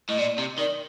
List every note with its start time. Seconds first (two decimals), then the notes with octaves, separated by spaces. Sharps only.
0.09 A2 D#5
0.19 A#2 D5
0.39 C3
0.58 D#3 D5